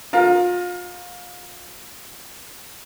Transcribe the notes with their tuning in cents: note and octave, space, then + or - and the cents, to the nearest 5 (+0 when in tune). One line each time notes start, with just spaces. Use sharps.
F4 +30 A#4 +0